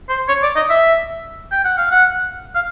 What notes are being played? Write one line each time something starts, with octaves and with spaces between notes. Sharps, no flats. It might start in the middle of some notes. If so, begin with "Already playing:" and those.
C5
C#5
D5
D#5
E5
G5
F#5
F5
F#5
F5